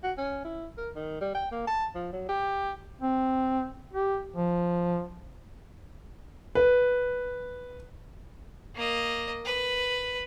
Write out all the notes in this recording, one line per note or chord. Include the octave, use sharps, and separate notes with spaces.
F#4
C#4
E4
A#4
D#3
G3
G5
A#3
A5
F3
F#3
G4
C4
G4
F3
B4
A#3 D#5
B4